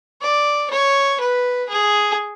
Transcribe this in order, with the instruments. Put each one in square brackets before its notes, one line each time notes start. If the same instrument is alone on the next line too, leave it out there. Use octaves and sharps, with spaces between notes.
[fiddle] D5
C#5
B4
G#4